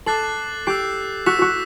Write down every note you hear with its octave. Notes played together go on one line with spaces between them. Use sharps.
A4 D6 F#6 A6 C7 F#7
G4 E6 G6 C7
F#4 E6 B6 E7
F#4